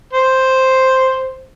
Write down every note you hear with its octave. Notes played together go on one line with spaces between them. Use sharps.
C5